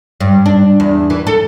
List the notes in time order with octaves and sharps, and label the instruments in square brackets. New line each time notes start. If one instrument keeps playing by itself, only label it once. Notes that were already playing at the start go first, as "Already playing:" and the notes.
[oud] G2
D4
E2
E3
A4